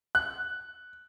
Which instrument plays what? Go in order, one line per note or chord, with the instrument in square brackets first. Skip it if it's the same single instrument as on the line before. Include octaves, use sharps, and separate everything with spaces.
[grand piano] F#6